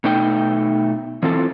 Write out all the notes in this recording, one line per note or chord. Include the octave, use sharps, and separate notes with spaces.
B2 A3 D#4 G5
E3 C4 F4 A4